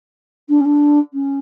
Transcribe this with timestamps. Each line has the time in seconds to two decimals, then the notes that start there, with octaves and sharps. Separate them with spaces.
0.48 D4
0.60 C#4
0.65 D4
1.13 C#4